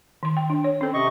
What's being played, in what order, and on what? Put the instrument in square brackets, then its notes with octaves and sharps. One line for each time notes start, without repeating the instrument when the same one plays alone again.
[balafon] D#3 C6
G5
D4
C#5
[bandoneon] C4 [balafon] C#4 A4
[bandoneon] C3 D#5 C#6